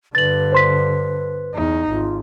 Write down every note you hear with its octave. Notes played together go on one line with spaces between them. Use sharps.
G2 D3 B4 A6 F#7
C5 C6 B6
E2 D#4
G#1 F4